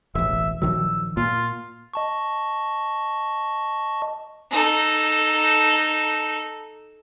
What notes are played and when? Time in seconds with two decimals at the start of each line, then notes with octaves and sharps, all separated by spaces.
0.15 E1 A1 E5
0.62 A#1 D#3 F#3 E6
1.17 A#2 F4
1.94 D#5 A5 C#6
4.50 D#4 A4